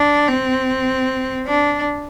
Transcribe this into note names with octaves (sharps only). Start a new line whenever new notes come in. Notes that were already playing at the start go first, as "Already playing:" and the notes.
Already playing: D4
C4
D4